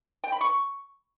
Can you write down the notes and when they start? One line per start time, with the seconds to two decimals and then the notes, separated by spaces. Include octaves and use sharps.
0.24 G5
0.32 B5
0.41 C#6